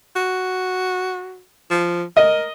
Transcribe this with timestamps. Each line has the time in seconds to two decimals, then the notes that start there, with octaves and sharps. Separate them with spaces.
0.16 F#4
1.71 F3
2.17 A#4 D#5